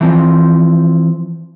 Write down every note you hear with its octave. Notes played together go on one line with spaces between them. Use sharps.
E3 F3 C4